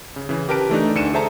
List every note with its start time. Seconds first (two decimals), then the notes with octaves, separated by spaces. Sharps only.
0.16 C#3
0.29 C#3 E3
0.49 G4 A#4 B4 A5 D7
0.69 E3 A3 D4 D#4
0.95 D2 D4 C#7 D#7 E7
1.13 G#4 A4 C5 E5 A5 A#5